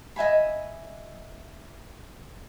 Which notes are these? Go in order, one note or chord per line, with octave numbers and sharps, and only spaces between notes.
D#5 E5 G#5 B5